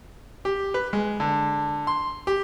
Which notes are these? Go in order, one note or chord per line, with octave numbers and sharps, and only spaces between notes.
G4
B4
G#3
D3
C6
G4